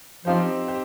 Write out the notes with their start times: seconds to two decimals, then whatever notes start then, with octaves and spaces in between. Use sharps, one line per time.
0.25 F3 C4 D#4 G4 C5
0.68 G4 C5